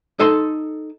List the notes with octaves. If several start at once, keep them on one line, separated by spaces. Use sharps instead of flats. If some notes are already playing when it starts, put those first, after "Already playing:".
D#4 A4 A5 C6